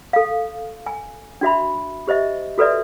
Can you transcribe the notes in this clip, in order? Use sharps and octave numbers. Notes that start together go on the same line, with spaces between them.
A4 F5
G#5
D4 F#4 E5 B5
G4 C5 D#5 E5
F#4 A4 B4 D5 E5